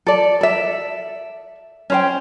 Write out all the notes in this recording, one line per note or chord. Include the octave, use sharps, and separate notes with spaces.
A4 D5
A4 E5
C#4 C5 G5